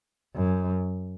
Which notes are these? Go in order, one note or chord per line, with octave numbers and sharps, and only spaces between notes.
F#2